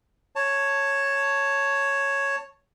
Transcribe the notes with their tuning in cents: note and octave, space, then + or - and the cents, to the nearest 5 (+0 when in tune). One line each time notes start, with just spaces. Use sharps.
C#5 +0 A5 +15